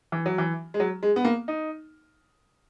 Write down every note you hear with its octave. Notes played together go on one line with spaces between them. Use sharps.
E3
F#3
E3
G#3
F#3
G#3
B3
A#3
D#4